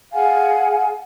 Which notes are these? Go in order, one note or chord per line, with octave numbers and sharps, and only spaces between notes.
G#4 F5 F#5 G#5